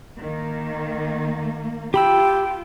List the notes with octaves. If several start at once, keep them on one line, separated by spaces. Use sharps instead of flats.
D#3 A#3
F4 G4 G5 B5 E6